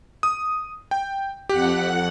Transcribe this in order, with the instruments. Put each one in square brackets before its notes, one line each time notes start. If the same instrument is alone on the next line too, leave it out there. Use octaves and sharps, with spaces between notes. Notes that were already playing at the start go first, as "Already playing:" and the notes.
[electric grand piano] D#6
G5
[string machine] F2 F#5 F#6 [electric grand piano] G4